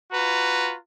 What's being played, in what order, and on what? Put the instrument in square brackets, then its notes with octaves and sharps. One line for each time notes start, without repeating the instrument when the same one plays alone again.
[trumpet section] F4 F#4 B4 A#5